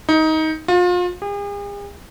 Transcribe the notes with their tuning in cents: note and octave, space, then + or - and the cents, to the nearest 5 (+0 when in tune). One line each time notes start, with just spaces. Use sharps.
D#4 +20
F4 +35
G#4 -45